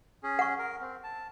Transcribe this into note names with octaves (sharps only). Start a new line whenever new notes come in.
C#4 G#4
F#5 C#6
A#4
C4
A5